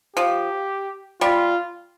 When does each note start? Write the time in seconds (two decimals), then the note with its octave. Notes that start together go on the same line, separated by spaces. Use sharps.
0.16 F3 G4
1.21 G3 F4